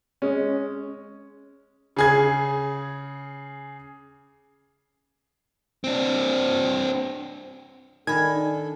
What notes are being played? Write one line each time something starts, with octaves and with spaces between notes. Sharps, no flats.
G#3 C#4
C#3 G#4 G#6
C4 D4
D#3 D4 A4 G#5 B5 G#6